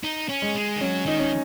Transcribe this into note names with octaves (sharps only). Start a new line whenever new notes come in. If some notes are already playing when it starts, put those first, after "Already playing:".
D#4
C#4
G#3
G#3
D#3
F#3 C#4
D#3 D#4
C#4